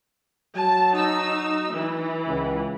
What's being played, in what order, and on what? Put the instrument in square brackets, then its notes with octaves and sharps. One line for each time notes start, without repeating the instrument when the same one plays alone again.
[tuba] F#3 [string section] A5
[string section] D#4 E6
E3
[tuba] C#2